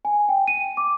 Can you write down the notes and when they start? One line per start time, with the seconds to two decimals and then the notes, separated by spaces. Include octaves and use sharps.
0.05 G#5
0.29 G5
0.48 D#7
0.77 D6